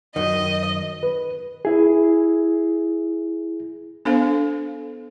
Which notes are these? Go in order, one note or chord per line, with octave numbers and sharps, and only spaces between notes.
F#2 D#3 D#5
B4
E4 G#4
B3 D4 A4 C5 F5